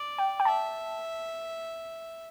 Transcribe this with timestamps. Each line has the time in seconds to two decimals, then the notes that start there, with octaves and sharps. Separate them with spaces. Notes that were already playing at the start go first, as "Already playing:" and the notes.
Already playing: D5
0.18 G5
0.40 G5
0.45 E5 A5